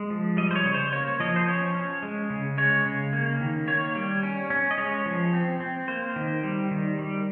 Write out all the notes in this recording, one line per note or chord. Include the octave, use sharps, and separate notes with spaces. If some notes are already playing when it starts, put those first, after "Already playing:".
Already playing: G#3
F3
G3 D#5
C5
C#5
C#3
C5
A#3 C#5
F3 D#5
C5
C#4 C#5
C#4
G#3
C#3
G#3 C#5
C#3
A#3
D#3
A#3 C#5
G3
C#4
C#4
D#5
G#3 C#5
F3
C4
C4
A#3 C5
D#3
G3
D#3
G3